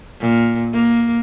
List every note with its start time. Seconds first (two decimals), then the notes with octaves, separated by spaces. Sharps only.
0.20 A#2
0.73 A#3